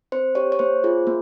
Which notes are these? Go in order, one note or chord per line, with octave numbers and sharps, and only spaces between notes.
C4 C5
G4 C#5
C#5
A#3 C5
F4 G#4
A#3